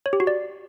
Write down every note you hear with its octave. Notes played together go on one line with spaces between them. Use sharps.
C#5
G4
F#4
D5